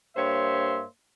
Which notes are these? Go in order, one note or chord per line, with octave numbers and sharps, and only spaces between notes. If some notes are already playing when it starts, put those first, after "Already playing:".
G2 A#3 C5 C#5 E5 C6